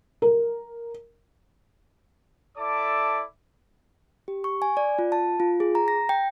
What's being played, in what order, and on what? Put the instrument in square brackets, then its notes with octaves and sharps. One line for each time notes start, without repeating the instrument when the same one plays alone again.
[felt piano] A#4
[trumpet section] E4 A4 D5 E5 A5 D6
[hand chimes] G4
C#6
G#5
D5
F4
A5
F4
G#4
A#5
A#6
G5